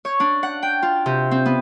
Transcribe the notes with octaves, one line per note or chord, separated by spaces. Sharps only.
C#5
D4
F#5
G5
F4
C3
C4
B3